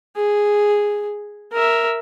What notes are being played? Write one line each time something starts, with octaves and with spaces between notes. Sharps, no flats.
G#4
A#4 E5